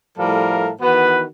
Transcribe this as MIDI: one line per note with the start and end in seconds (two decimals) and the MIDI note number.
0.18 0.71 45
0.18 0.71 53
0.18 0.71 55
0.18 0.71 69
0.18 0.71 70
0.18 0.71 77
0.82 1.24 51
0.82 1.24 52
0.82 1.24 59
0.82 1.24 66
0.82 1.24 71